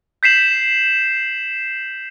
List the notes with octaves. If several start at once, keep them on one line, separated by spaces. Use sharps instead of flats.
G6 B6 C7 E7 F#7